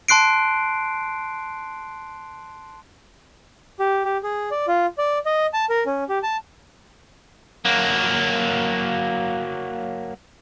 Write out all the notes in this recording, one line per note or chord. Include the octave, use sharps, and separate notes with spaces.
A5 C6 F#6 C7 D7
G4
G4
G#4
D5
F4
D5
D#5
A5
A#4
C#4
G4
A5
F#3 A#3